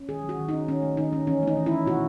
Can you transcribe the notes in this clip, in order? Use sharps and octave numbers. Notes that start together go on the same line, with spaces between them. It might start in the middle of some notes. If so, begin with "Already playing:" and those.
Already playing: C#4
D#3 G#4
F#3
F#4
D#3
C#4 D#4
D#3 C#4
A3
D#3 D#4
C#4
E3 C#4
A3
D#4
E3
E4
C#4
B2 F#4